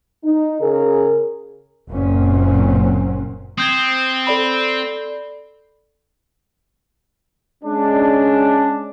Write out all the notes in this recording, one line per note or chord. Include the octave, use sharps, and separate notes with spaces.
D#4
C#3 G#4 A#4
F#1 A#2 F#3 C4 C#4
C4 D#6 G6 G#6
A4 D5 B5
G#3 C#4 D4